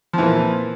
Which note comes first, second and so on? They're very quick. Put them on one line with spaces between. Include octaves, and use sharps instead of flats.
F3 E3 A#2